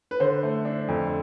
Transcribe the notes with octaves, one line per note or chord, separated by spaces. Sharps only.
B4
D3 C5
A3
D4
F2